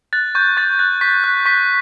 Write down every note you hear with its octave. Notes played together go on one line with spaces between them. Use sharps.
F#6 A6
C#6 G6
C#6 A6
F#6 A6
C#6 B6
F#6
C#6 B6